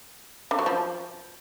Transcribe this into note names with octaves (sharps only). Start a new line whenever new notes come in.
D3
F#3
F3